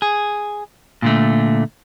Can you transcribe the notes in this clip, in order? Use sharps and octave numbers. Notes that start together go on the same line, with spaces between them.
G#4
A#2 D3 A3